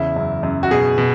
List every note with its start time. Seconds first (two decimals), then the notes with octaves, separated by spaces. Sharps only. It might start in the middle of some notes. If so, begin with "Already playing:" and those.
Already playing: E2 C#3 E4
0.16 F#2
0.43 F#2
0.63 F#4
0.71 B2 G#4
0.98 B2